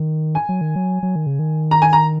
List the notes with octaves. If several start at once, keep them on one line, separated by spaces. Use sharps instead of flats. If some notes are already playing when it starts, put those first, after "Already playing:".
Already playing: D#3
G#5
F#3
D#3
F#3
F#3
D#3
C#3
D#3
A#5
G#5
A#5